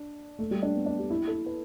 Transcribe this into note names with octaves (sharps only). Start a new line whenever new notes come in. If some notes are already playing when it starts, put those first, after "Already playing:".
Already playing: D4
A3
G3
D4
B3
D4
G4
E4
A4
B4